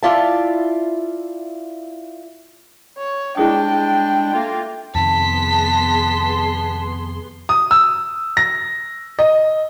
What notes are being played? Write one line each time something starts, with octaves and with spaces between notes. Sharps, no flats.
E4 F4 D5 E5 A5
C#5
G3 G#3 D4 E4 G#4 G5 D#6
A3 A#3 F4
F2 C3 D#3 B3 G#4 A5 C6 B6
D#6
E6
A#6
D#5